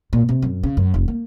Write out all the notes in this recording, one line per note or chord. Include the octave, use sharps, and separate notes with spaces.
A#2
C3
F#2
C#3
F#2
F1
A#3